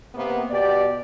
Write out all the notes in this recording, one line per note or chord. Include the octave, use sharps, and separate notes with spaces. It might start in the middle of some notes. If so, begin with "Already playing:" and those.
C3 A#3 B3
B2 G4 D5